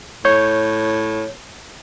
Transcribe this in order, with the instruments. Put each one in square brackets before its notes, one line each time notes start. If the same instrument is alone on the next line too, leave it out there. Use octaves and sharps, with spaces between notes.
[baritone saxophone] A2 [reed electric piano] C#5 G6